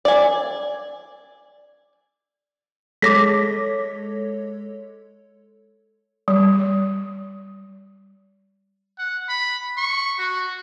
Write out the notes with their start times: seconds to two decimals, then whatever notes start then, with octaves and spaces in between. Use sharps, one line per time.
0.05 D5 G#5
3.02 G#3 A4 C#5 D6 A#6 B6
6.28 G3
8.98 F#5
9.29 B5
9.77 C#6
10.18 F#4